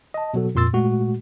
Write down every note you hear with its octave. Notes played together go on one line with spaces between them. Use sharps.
D#5 A5
B2 F#3 F#4 A4
F2 A#2 C6 E6 A6
A#2 G#3 A3 F#4